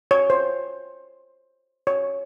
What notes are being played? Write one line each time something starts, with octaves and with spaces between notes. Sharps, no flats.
C#5
C5
C#5